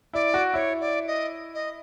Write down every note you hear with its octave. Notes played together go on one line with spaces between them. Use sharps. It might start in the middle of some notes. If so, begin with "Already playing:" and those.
E4 D5
F#4
E4 C#5
D5
D#5
D#5